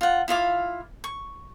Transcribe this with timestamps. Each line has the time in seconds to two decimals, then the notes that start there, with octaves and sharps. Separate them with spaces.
0.01 F4 F#5
0.28 E4 F4 F5 D6
1.04 C#6